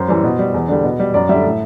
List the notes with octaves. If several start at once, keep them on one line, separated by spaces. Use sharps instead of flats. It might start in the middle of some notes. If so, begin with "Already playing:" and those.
Already playing: F#2 C5
E3 G3
B2
G3
E2
D3 G3
B2
G3
F#2 D5
D3 G3 E5
A2